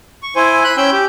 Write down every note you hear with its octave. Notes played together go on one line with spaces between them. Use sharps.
C#6
E4 C5 G#5
B5 F#6
C#4 G5 E6 G6
G4